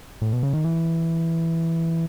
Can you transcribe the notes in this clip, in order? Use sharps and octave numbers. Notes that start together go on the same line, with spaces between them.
A2
B2
C#3
D#3
E3